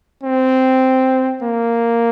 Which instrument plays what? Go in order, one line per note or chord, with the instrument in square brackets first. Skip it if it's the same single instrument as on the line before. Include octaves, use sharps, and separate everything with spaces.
[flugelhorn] C4
A#3